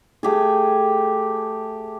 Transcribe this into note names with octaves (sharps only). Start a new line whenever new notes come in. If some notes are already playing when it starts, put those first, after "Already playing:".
A3 G4 G#4